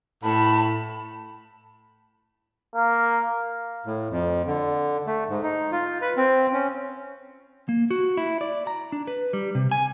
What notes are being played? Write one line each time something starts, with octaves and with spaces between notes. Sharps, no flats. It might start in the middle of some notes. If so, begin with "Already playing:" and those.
A2 A5 B5
A#3
A2
F2
D3
A3
G#2
D#4
F4
B4
C4
C#4
A#3
F#4
E4
D5
A#5
D4
B4
G3
C3
G#5